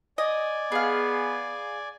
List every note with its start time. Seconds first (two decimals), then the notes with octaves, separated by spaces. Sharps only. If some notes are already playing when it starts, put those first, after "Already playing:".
0.18 D5 D#5 G#5
0.72 B3 G#4 F5